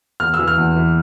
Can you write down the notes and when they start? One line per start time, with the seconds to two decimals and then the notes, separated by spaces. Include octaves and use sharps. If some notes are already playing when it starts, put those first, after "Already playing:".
0.20 E2 F6
0.34 E6
0.39 E3
0.48 F6
0.58 E2
0.76 E3